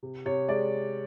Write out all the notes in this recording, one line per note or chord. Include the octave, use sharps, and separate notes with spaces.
C3
C3 C#5
G#3 D5